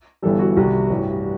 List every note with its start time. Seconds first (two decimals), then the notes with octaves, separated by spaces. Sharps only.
0.22 G1 G2 E3 G3 A4
0.39 F#4
0.56 C2 C3 D#3 F#4
0.90 A1 G2 E3 G3